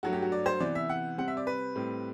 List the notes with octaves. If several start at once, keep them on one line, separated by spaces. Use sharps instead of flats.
G2 F#3 A3 F#4
G4
F#4
D5
C5
C3 E3 B3 D5
E5
F#5
C3 G3 C4 F#5
E5
D5
B4
A2 G3 C4